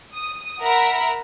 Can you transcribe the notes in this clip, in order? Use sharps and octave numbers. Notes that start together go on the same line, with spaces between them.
D#6
A#4 E5 F#5 A#5 B5